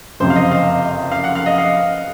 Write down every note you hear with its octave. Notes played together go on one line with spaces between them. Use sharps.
F#1 F2 C3 C5
F5
D#5
F5
F5
F#5
F5
D#5
F5